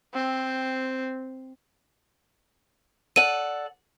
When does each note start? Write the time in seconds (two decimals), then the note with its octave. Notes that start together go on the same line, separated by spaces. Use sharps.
0.14 C4
3.16 A4 D5 F#5 D#7